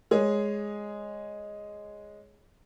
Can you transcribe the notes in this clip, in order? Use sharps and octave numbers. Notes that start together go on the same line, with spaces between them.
G#3 G#4 C#5